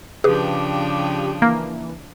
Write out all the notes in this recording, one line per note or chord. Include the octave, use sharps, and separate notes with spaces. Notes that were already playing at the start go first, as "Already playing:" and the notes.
C#3 F3 D4 G4 G#4 B4
E3 A#3